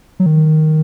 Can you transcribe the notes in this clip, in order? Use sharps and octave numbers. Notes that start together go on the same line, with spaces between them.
F#3
D#3